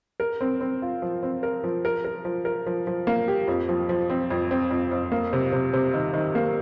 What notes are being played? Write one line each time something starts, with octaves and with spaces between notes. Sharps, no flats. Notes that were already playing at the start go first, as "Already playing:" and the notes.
A#4
C4
C4
F4
F3
C4
A#4
F3
A#4
A#4
F3
A#4
F3
F3
A#3
G4
F2
F3
F3
C4
F2
C4
F2
F2
A#3
C3
C3
C3
D#3
D#3
A#3